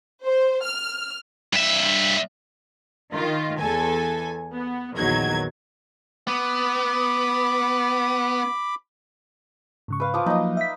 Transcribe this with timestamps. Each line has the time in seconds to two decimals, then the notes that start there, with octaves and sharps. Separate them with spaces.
0.24 C5
0.63 F6
1.53 G2 E5
3.13 D#3 F4
3.59 E2 A4 G#5
4.54 B3
4.94 A#1 E2 D#3 F#3 G#6
6.27 B3 B5 D6
9.88 G#2 C#3 C#6
10.00 B4 F5
10.14 F3 D6 D#6
10.26 F3 F#3 A#3 D#4 D#5
10.57 E5 B6